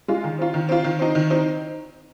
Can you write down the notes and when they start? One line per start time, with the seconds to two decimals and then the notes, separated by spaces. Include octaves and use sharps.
0.08 G#3 F4
0.24 D#3
0.39 C4 F4
0.54 D#3
0.69 C4 F4
0.84 D#3
0.99 C4 D#4
1.15 D#3
1.30 C4 D#4